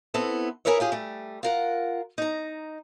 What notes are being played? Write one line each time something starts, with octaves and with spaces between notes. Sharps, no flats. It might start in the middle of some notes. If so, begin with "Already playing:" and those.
B3 C4 E4 A4
E4 G#4 A#4 B4 C#5 E5
F4 G4 G#4
G3 A3
F4 A#4 F#5
D#4 A#5